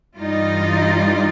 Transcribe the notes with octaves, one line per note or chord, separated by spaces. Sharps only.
G2 E3 G3 D#4 F4